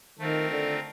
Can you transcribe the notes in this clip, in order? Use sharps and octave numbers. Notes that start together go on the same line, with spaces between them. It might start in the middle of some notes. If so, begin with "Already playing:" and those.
D#3 A3 C4 F4 A#4
D3